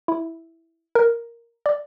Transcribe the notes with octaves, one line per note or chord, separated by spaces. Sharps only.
E4
A#4
D5